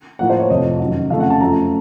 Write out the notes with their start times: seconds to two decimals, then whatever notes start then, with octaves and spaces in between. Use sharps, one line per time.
0.19 A2 F3 A#3 F#5
0.30 C5
0.40 C#5
0.50 F2 C3 F3 A3 D#5
0.80 F#2 D#3 F#3
1.10 F2 C#3 A3 F5
1.20 F#5
1.30 A5
1.41 F#2 F3 A3 A#5